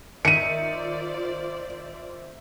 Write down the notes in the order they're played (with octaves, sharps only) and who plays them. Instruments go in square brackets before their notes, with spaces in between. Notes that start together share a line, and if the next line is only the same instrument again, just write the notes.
[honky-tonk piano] D#3 [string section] F4 C5 D5 [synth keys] E5 [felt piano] C#7 D#7